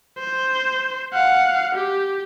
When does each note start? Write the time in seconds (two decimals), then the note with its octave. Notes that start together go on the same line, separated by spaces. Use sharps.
0.18 C5
1.13 F5 F#5
1.75 G4